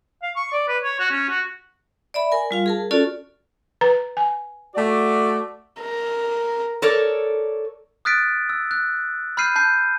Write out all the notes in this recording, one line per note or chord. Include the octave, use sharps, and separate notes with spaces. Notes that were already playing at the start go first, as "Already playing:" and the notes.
F5
C#6
D5
B4
C#5
F#4
C#4
F#4
D5 E5 B5
A#4 G#5
G3 F4 F5
G#4 A#4 A5
C#4 F4 F#4 A4 D5
B4 A#5
G#5
A3 F#4 D5
A#4
A4 A#4 C#5 D5
D#6 F6 F#6 A6 B6 D7
E6
F#6
B5 F6 G6 C7 D#7
A5 G6 C7